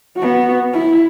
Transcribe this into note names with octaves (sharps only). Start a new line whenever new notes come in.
B3 F#4
E4